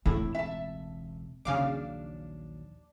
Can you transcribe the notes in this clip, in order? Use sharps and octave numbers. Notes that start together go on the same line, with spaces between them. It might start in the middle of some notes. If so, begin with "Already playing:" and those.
E1 C#2 A2 C4 E4
E5 A5
A#1 D#2 C#3 F#3 D4 F5 D6